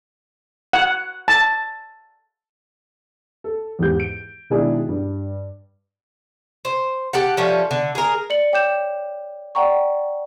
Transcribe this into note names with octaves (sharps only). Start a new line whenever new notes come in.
F#5
A5
A4
E2 G#2 G4 G6
D7
B2 D#3 G#3 D4 E4 G#4
G2
C5
G4 A4 F#5
F3 G3 A3 C#4
D3
G#4 A#4
D5 C#7 F#7
C#5 G5 D6 G6 E7
D5 F#5 G5 A#5 C#6